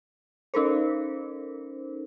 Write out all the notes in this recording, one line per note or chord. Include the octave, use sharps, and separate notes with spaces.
C#4 D#4 A4 A#4 C5